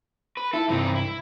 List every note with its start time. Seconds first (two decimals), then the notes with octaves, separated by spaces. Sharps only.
0.37 B4
0.53 E4 A4
0.69 C2 G2 E3 C4 D#4
0.95 E4